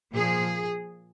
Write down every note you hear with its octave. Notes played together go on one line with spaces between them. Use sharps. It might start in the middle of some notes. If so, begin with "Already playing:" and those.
A#2 F3 G#4